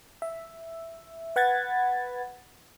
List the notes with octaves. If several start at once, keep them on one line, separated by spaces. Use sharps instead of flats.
E5
B4 F#5 B5 G#6 A6